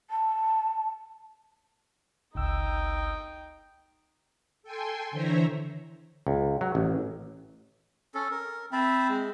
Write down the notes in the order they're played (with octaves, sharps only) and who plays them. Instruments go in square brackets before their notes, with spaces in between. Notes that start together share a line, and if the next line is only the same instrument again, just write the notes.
[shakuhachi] A5
[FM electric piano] G1 C#2 E6 [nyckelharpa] D#4 G5
[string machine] A4 G5 G#5 C6
D3 E3 C5 C#5 E5 A#5
[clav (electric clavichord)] C#2
F#3
A1
[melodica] C#4 A4
A#4
[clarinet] C4 [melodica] E5 A5 B5
[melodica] G#3